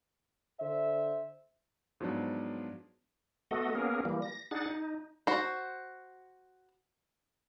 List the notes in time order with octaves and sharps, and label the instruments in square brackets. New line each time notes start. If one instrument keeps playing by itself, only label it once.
[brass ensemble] D3 C5 E5
[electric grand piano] G#2 F3 F#3 B3 D4
[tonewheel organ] A3 B3 F#4 A4 D#5
A#3 B3 C#4 G#4 A#4
E3 G3 A#3
A#6
D4 D#4 G#4 F#5 A6
D#4
[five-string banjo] F#4 C5